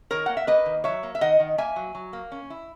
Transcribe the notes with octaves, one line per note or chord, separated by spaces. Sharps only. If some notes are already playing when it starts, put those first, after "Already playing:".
D#3 A#4 C#5
A#3 F#5
E5
A#3 B4 D#5
D#3
F#3 C#5 E5
A#3
E5
D#3 D#5 F#5
D#3
A#3 E5 G#5
F#3
F#3
A#3
C#4
E4